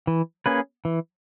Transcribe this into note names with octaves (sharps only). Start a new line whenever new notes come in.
E3
A#3 C#4 G#4 B4
E3